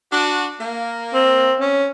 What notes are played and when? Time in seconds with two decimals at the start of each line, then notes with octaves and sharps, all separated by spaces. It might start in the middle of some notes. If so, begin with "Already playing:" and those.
0.12 D4 F#4
0.61 A#3
1.14 C4
1.60 C#4